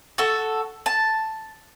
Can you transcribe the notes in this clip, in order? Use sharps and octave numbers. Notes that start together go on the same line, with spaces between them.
F#4 A4
A5